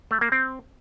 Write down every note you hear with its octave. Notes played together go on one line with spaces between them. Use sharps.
A3
A#3
C4